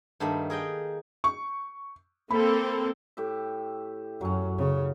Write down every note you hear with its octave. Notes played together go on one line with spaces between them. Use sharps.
G2 D#3 A3 A#3 B5
G#4 A#4 D#5 G5
C#6
A#3 C4 A4 B5
A2 G4 E5
F#2 F#3 C#4
C#3